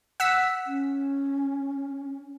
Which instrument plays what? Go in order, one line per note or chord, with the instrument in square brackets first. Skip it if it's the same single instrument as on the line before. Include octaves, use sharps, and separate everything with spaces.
[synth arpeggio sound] F#5 E6 B6
[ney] C#4